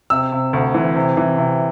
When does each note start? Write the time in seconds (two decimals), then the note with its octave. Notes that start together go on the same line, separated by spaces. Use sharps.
0.10 C3 E6
0.32 C3
0.53 D2
0.74 E3
0.96 C3
1.17 E3
1.38 C3